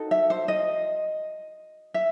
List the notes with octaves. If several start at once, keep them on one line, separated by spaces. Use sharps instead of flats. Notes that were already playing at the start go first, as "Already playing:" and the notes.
Already playing: D#4 F#4 A4
E5
C5
D#5
E5